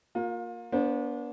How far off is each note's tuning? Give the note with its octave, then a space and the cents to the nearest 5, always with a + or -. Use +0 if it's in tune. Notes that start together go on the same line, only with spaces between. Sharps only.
A#3 +0 F4 +30
B3 -40 D4 -30 C5 +0